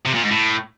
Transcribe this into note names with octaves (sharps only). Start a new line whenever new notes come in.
C3
A#2
G#2
A2